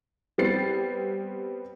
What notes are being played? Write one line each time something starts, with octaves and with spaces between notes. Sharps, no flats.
G3 B3 C4 A6 C7